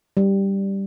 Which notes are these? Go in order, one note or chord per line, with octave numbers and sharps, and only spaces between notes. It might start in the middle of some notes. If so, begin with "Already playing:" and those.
G3